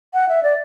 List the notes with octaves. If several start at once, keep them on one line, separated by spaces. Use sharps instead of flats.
F#5
E5
D5